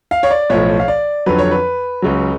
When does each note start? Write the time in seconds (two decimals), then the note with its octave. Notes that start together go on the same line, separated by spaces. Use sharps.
0.11 F5
0.23 C#5
0.30 D5
0.50 B1 A2 F3 C#5
0.80 F5
0.88 D5
1.26 F2 D3 F#3 B4
1.38 C#5
1.51 B4
2.02 C#2 C#3 F#3